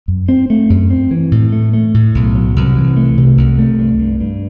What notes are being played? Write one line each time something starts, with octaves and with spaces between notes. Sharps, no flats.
F#2
C4
A3
F#2
C4
E3
A2
A3
A3
A2
B1
F#3
C2
E3
A3
C3
C2
A3
G2
G2
G2